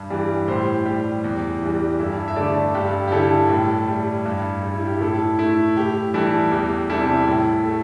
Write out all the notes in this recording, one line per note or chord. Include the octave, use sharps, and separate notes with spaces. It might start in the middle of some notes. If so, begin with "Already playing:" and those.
Already playing: G2
E3 G3
A2 G4 C5
G3 G4
E2
E3 G3
G2 E4 A4
E5
D3 A3 A4 D5
G2 G4
G4
D3 G3 E4 A4
A2
G3
G2
G3
E4
G4
A2 E4 A4
A3 E4
A2 G4
E3 G3 E4 A4
E2 G4
C3 G3 E4 A4
A2
A3